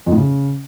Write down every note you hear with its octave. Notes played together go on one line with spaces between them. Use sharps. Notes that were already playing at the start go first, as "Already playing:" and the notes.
F2
A2
C#3